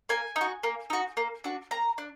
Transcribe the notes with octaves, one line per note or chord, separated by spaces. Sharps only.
A#3 G#5
D#4
F#4
A#3
D#4 F#4
A#3
D4 F#4
A#3 A#5
D4